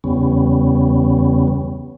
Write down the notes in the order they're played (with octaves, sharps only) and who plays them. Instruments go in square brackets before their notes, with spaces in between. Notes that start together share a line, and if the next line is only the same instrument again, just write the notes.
[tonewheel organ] E2 C#3 G3 B3 C#4